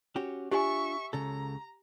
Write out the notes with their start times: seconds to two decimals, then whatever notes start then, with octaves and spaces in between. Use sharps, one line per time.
0.16 C#4 F#4 G4
0.51 D4 F4 G4 E5 G#5 C#6
1.13 C#2 C#3 A4 A#5